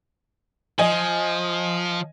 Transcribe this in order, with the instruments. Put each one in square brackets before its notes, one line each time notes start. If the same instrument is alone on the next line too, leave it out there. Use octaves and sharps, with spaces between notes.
[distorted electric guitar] F3 [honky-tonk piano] D#5 G#5